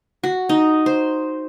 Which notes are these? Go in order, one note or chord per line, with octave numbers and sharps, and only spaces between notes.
F#4
D#4
C5